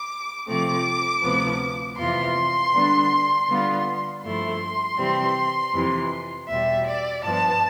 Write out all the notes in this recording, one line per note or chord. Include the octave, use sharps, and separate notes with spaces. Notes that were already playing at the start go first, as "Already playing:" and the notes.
Already playing: D6
C3 F3 A3 C4 D6
D2 C3 F3 B3
F2 C3 E3 B3 F4 C6
D3 G3 B3 D4
D3 G3 B3 F4
G2 F3 A3 E4 C6
C3 E3 G3 C4
F2 C3 E3
E2 B2 G3 E5
D5
G2 F3 B3 A5